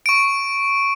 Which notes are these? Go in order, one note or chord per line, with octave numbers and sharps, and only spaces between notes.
C#6 D7